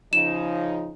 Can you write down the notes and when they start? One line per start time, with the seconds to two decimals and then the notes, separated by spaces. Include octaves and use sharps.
0.13 C#3 F3 D#4 E7